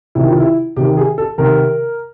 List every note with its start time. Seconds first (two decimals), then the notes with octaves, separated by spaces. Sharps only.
0.15 C3 D#3 E4
0.28 F4
0.40 E4
0.76 C3 D#3 G4
0.97 G#4
1.18 A4
1.38 C3 D#3 A#4